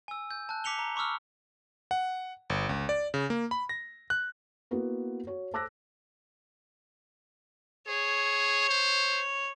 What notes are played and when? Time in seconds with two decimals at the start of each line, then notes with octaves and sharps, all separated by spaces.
0.08 G#5 E6
0.31 G6
0.49 A5 F#6
0.64 D6 B6 C#7 F7 G7
0.79 A#5
0.96 B5 C#6 D6 E6 F6
1.91 F#5
2.50 G1
2.69 C#2
2.89 D5
3.14 C#3
3.30 A#3
3.51 B5
3.69 A#6
4.10 F#6
4.71 A#3 B3 E4 F#4 B4
5.27 F#4 C#5
5.53 C5 A5 D6 E6 F#6 A#6
7.87 G#4 C#5
8.69 C5